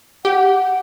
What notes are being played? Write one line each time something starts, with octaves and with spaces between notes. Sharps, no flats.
G4 F#5